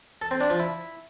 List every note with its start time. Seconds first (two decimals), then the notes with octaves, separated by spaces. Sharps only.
0.22 A4
0.31 C4
0.40 D4
0.50 F3
0.59 E4